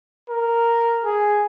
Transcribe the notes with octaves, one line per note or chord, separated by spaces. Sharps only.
A#4
G#4